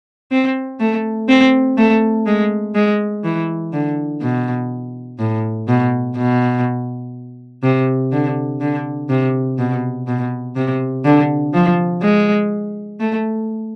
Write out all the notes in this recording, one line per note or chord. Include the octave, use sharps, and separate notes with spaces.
C4
A3
C4
A3
G#3
G#3
E3
D3
B2
A2
B2
B2
C3
D3
D3
C3
B2
B2
C3
D3
F3
G#3
A3